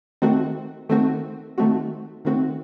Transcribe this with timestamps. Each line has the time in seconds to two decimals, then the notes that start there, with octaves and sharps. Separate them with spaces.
0.22 D#3 A3 C4 F#4
0.89 D#3 A3 C4 F#4
1.58 D#3 A3 C4 F#4
2.25 D#3 A3 C4 F#4